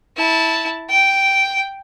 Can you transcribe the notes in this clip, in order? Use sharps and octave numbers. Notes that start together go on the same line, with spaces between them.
E4 A5
G5